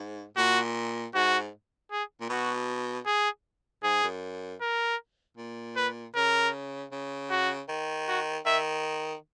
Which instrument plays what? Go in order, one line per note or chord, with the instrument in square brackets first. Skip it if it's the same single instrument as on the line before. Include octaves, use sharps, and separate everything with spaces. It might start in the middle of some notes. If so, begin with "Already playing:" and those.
Already playing: [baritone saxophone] G#2
[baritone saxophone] A#2 [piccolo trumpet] F#4
[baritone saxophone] G#2 [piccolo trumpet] F#4
[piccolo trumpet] G#4
[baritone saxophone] A#2
[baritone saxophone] B2 [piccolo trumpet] F#4
[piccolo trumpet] G#4
[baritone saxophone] G#2 [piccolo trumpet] G#4
[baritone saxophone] F#2
[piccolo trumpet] A#4
[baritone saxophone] A#2
[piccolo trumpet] B4
[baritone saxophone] C#3 [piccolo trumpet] A#4
[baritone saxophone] C#3
[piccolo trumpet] F#4
[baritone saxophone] D#3
[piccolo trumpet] F#4
[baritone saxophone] D#3 [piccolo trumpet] E5